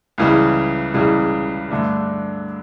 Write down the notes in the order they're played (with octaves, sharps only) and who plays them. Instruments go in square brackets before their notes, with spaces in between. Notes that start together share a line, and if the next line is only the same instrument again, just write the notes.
[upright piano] C#2 C#3 E3 G3
C#2 C#3 E3 G3
G2 D3 A3 D4